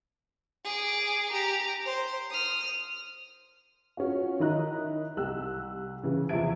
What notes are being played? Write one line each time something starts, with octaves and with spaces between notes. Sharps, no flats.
G#4 D6
G4 A#5
C5
D#6 F6
C#4 F4 F#4
D#3 D#4 E4 D#5 A#5 F#6
C2 G4 E6 F#6
C#3 E3
E2 C3 F3 E5 G#6 D7